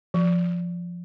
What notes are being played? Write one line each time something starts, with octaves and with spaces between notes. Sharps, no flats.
F3